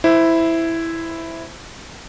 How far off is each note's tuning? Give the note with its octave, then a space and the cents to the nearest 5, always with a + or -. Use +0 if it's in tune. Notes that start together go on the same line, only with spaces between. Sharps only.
E4 +0 C5 -15